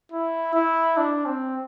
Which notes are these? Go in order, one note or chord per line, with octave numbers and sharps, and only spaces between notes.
E4
E4
D4
C4